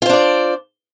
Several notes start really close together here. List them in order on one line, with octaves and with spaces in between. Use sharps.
F4 C5 D4 D5